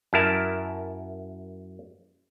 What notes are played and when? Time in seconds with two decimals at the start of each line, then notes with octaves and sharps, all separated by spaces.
0.13 F#2 E4 A#4 A5